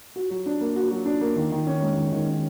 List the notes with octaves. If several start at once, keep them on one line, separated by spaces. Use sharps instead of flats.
F#4
F#3
D4
A#3
F#4
F#3
D4
A#3
D#3
D#3
C#4
G#3
D#3
D#3
C#4